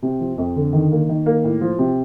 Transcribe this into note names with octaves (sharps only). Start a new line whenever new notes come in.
C3
F3
F2
D3
D#3
A#3
D#3
A#3
A2
F3
C3